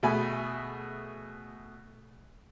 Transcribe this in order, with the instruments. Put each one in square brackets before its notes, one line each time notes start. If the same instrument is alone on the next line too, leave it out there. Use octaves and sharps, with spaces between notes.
[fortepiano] B2 A3 G#4 G#5 B5